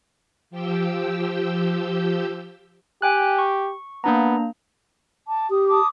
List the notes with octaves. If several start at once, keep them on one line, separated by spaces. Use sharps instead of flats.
F3 G4 G5 E6
G4 G5 G#5 F#6
C#6
A#3 B3 D4 A#5
A5 D6
G4 D#6
A5 D6 D#6